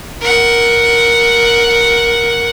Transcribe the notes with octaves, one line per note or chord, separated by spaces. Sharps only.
A#4 F#5